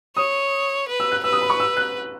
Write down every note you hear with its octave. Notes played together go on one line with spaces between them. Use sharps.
C#5 D#6
B4
E6
F#6
B4 E6
D#6
B5
C#6
E6
F#6